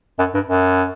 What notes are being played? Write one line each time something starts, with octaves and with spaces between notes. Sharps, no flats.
F#2
G2
F#2